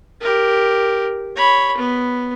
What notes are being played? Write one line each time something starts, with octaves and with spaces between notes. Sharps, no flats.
G4 A#4
C#5 B5
B3